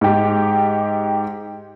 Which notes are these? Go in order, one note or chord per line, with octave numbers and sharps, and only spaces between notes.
G#2 G4